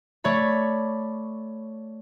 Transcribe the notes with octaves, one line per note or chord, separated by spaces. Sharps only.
A3 C#5 D5 B5